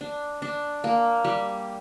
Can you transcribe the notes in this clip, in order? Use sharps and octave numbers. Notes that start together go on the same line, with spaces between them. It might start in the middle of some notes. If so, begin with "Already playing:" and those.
D4
D4
A#3
G3